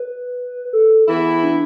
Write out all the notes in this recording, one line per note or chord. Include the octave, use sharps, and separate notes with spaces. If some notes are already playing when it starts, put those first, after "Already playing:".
Already playing: B4
A4
E3 B3 E4 G#4
D4